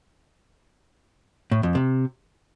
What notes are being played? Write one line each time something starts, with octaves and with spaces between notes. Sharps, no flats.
A2
F2
C3